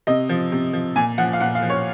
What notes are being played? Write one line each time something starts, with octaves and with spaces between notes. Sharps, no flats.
C3 D#5
F3
C3
F3
A#2 G#5
F3 F#5
F5
A#2 F#5
F5
F3
C#5